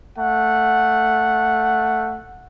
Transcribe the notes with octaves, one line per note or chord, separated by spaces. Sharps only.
A3 F#5